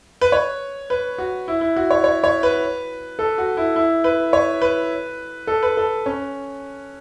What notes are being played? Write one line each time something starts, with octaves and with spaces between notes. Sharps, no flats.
B4
C#5
B4
F#4
E4
E4
F#4
C#5
C#5
C#5
B4
A4
F#4
E4
E4
B4
C#5
B4
A4
B4
A4
C#4